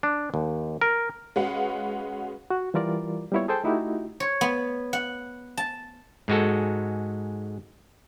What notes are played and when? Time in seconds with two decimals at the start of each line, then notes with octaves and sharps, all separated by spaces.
0.03 D4
0.34 D#2
0.81 A#4
1.36 G#3 C#4 F#4 B4 F5 F#5
2.50 F#4
2.74 E3 G3 F4 A#4 D5
3.32 G3 A#3 B3 E4 F4 C#5
3.48 G#4 A4 C5 G5 A5
3.64 A3 D#4 E4 F#4 G4
4.20 C#5
4.41 B3
4.93 F#5
5.57 A5
6.28 G#2 G#3 F#4 A4